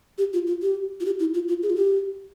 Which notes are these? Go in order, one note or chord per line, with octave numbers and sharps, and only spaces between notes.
G4
F4
F4
G4
F4
G4
E4
F4
F4
G#4
F4
G4